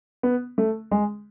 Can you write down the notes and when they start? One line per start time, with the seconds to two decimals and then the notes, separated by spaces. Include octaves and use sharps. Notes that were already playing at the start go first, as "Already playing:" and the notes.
0.23 B3
0.58 A3
0.91 G#3